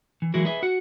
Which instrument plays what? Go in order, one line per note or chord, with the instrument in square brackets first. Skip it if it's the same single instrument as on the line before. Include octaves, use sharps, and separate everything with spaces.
[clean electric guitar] E3
E3 F#3 G#3 E4 F#4 A#4
G#4 B4 D#5 E5
F#4 F#5